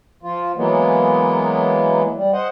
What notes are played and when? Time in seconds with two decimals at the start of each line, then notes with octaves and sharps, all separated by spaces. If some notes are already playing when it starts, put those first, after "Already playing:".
0.23 F3 F4
0.56 E3 F#3 G#3 A#3 B3
2.15 G3
2.33 C5 D#5 F#5